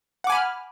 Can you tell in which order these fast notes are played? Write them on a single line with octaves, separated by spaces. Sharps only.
F#5 D6 G#5 B5 F6